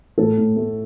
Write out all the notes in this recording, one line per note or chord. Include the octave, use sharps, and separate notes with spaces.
A2 A4
A2
A3